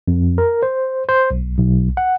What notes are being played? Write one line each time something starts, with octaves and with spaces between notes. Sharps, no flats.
F2
A#4
C5
C5
B1
B1
F#5